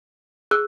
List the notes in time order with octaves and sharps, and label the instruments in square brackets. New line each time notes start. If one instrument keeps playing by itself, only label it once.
[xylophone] G#4 E6 F#6